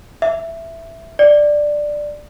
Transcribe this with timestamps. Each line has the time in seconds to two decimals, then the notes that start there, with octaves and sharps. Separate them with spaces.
0.22 E5
1.19 D5